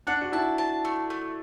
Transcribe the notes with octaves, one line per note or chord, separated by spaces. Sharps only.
D4 F#5
F#4
E4 A5
A5
A3
A3